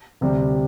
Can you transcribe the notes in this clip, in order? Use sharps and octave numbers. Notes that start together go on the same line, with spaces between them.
D2 C3 G3